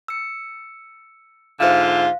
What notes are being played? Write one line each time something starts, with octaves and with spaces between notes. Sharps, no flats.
E6 C#7
G#2 D3 F4 C5 E5 F5